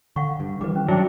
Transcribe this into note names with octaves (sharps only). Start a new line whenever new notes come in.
D3 F5 F#5 C#6
G2
D#3 E3 G3 B4 D6
C#4
G2 F#3 D4 E5 G5 D6